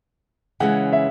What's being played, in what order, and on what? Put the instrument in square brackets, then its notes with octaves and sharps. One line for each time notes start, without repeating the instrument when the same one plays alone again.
[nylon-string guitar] C#3 E3 G#3 C#4 [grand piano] F#5
[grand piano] E5